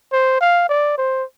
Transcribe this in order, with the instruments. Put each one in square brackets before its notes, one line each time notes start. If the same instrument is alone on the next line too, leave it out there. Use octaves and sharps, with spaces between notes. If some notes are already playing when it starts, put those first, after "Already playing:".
[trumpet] C5
F5
D5
C5